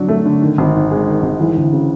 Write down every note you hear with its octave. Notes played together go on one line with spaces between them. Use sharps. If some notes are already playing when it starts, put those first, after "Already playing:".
Already playing: D3 F#3 D4
A3
D3
D#3
G#1
G#2
G#3
D#3
G#1
E3
D2
C#3